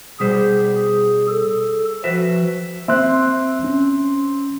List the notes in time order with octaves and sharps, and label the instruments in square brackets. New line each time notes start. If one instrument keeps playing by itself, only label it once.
[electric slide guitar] B2 G3 C5 [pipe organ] G#4
[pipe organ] A4
[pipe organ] F3 [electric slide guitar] F#4 B4 E5
[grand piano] C4 [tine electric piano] E5 C6 F#6
[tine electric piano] C#4